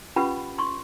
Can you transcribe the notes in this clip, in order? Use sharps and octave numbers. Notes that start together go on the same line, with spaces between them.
C#4 F4 G4 B4 F#5 B5
C6 C#6